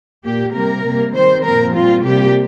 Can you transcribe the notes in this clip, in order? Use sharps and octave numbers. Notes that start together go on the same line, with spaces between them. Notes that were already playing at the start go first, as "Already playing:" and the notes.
A#2 A#3 G4
C3 G3 A#3 A#4
C3 G3 A#3
D#3 G3 C4 C5
A#2 F3 C4 A#4
A#2 G3 C4 F4
C3 G3 A#3 G4